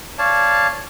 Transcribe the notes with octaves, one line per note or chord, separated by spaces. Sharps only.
C#5 D5 F5 A5